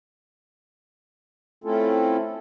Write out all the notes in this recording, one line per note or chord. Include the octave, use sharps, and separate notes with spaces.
A3 C4 C#4 E4 F4 A4